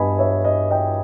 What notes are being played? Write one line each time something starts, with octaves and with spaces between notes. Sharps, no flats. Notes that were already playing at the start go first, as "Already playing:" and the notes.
Already playing: G2 G3 B3 D#5 G#5 B5
C#5 E5
D#5
D#5 G5